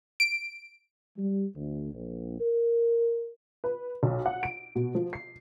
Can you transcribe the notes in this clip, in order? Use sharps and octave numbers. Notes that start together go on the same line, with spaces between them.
D7
G3
D2
A#1
A#4
B4
B1
F#5
D7
B2
F3
C7